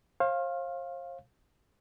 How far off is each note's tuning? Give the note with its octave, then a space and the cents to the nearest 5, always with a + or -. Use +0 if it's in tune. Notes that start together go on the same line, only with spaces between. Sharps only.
C5 +45 F5 +0